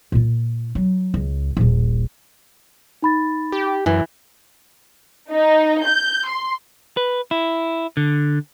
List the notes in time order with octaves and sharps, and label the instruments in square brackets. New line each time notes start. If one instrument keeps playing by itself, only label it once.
[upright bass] A#2 F4
F#3
C#2
D#1 A#1
[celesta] D#4 B5 A6
[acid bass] G4
[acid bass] F#2 [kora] E3
[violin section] D#4
G6
C6
[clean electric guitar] B4
E4
D3